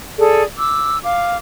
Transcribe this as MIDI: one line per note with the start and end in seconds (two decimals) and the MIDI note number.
0.18 0.43 68
0.18 0.43 69
0.18 0.43 74
0.57 0.97 86
0.57 0.97 88
1.03 1.38 77
1.03 1.38 86